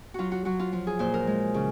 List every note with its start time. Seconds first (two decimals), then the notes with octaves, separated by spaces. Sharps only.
0.14 F#3 F4 F#4
0.32 F#4
0.45 F#3 F#4
0.59 F4
0.73 F3
0.87 G#4
0.99 A#2 C5
1.14 A#4
1.27 G#3
1.54 C#3